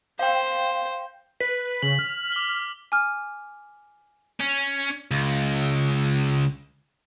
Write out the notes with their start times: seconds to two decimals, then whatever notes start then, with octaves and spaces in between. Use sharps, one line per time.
0.19 C5 F5 G5
1.40 B4 B6
1.82 C#3 F#7
1.99 F6
2.32 D6 G7
2.92 G#5 D6 F6
4.40 C#4
5.11 C#2